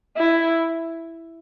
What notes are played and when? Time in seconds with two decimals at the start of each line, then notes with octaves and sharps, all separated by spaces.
0.17 E4